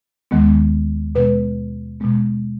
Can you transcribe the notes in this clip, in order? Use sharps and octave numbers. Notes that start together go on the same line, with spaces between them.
D#2 D#3 G#3 B3
B2 G#3 B3 B4
B2 G#3 B3